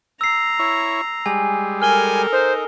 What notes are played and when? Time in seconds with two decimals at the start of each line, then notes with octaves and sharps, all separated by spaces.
0.21 A#5 E6 C7
0.59 E4 C#5
1.26 G3 G#3 G#5
1.82 A4 A#4 G#5 F6 G7
2.32 D#4 C5